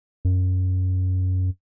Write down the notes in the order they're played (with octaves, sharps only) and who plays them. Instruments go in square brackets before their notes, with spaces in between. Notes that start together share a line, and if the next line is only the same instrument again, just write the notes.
[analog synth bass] F#2